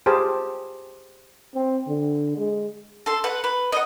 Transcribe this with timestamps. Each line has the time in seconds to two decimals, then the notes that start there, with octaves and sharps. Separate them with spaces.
0.06 G4 G#4 C5 A5
1.55 C4
1.88 D3
2.37 G#3
3.06 A4 C6
3.24 B4 F#5
3.44 B4
3.72 D#5 F#5